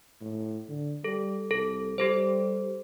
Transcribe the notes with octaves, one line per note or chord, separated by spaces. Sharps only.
A2
D3
G3 A4
C2 A4
G3 G4 A4 C5